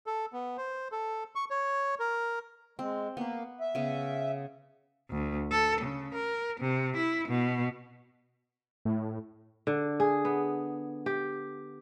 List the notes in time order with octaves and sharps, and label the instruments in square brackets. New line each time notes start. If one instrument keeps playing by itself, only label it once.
[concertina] A4
B3
C5
A4
C#6
C#5
A#4
[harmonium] G#3 [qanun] C4
[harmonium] A#3 [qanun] B3 B4
[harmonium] E5
[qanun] C#3 B3
[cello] D2
A4
C#3
A#4
C3
E4
B2
[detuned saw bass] A2
[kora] D3
G#4
B3
G4